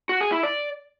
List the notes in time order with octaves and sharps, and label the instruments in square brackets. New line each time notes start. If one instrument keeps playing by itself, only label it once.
[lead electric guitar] F#4
G#4
E4
D5